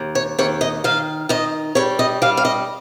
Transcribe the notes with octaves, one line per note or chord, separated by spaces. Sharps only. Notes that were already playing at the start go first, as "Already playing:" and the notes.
Already playing: D#2
C#5
D#2 C#5
D#5
D#3 F5
D#3 D#5
G3 C#5
D#5
G3 F5
F5
D#5